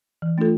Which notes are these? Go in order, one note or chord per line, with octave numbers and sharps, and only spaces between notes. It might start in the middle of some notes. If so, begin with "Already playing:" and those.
E3
A3 D4 F4 A4